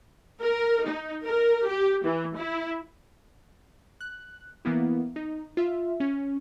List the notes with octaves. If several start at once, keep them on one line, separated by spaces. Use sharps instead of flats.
A#4
D#4
A#4
G4
E3
E4
F#6
E3 A#3 B3 E4
D#4
F4 E5
C#4